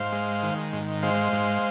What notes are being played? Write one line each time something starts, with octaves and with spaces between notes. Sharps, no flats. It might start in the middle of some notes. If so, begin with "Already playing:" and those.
Already playing: G#2 C5 F5
G#3
D#3
G#2
G#3 C5 F5
G#2